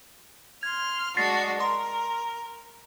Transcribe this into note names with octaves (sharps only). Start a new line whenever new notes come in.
C6 F6 G#6
G#3 D4 F#4 A6 A#6 C7
A#4 C6